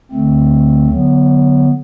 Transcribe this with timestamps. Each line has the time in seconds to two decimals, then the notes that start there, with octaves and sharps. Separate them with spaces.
0.11 D2 D3 A3 C4
0.90 D3 F#3 B3